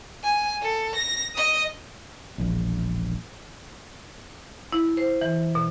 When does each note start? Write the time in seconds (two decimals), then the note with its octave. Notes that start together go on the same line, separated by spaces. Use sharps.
0.23 G#5
0.62 A4
0.95 A#6
1.35 D#5 D#6
2.38 E1 A#1
4.73 E4
4.97 C5
5.21 E3
5.55 B2